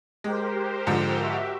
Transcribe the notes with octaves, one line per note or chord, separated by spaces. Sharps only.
G#3 G4 A#4 C5
G#2 D3 F3
F#4 G4 E5